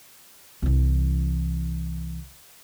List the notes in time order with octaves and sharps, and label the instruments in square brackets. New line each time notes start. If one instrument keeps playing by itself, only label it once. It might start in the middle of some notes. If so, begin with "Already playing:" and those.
[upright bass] C2 E3